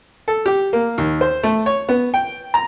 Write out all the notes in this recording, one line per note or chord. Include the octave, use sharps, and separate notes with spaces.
A4
G4
A#3
D#2
C5
A3
C#5
B3
G5
A#5